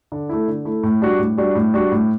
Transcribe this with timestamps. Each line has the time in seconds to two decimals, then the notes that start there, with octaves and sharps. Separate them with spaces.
0.12 D3
0.29 A3 E4
0.48 D3
0.65 A3 E4
0.83 A2
1.02 G3 D4 F#4
1.19 A2
1.37 G3 D4 F#4
1.55 A2
1.74 G3 D4 F#4
1.92 A2